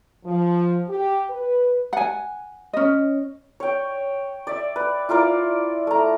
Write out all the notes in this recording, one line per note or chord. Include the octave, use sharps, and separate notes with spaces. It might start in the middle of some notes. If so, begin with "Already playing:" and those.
F3
G4
B4
F#5 G#5
C#4 D#5
C#5 G5
D5 E5
B4
E4 F4 A#4 D5
A3 A#5